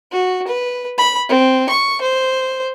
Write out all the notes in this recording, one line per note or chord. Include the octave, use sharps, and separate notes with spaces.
F#4
B4
B5
C4
C#6
C5